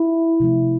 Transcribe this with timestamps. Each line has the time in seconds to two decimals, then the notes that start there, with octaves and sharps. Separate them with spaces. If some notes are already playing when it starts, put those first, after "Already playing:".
Already playing: E4
0.40 C3 F3 A3